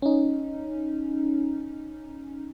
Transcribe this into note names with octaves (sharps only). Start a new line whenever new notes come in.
C#4 D#4